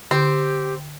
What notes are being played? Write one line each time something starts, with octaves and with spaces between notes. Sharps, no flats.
D3 C4 G4